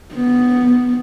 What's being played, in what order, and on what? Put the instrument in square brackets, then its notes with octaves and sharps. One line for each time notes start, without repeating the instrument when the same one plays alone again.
[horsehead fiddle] B3